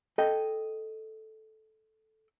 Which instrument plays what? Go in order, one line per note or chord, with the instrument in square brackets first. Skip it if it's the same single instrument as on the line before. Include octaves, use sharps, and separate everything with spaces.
[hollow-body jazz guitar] A4 D#5 G5